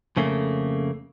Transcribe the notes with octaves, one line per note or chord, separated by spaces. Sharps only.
F2 C#3 A3 A#3